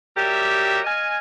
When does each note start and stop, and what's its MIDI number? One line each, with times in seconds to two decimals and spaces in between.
0.16 0.79 54
0.16 0.79 55
0.16 0.79 67
0.16 0.79 70
0.16 0.79 76
0.85 1.18 75
0.85 1.18 77
0.85 1.18 80